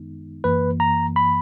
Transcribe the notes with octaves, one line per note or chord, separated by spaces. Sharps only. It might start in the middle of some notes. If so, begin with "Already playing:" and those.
Already playing: F#2 D#3 G#3 B3 D#4
F#2 E3 A#3 B4
A#5
B5